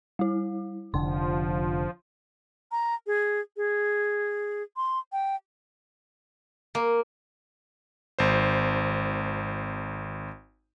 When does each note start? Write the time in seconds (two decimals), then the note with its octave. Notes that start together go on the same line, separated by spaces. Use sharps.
0.19 G3 E4
0.94 F1 D3 F3 C6
2.72 A#5
3.07 G#4
3.57 G#4
4.77 C6
5.12 G5
6.75 A#3
8.19 G#1 C5